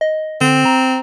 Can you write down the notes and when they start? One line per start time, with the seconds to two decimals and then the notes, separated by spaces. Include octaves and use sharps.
0.01 D#5
0.41 D3 C4
0.65 A#5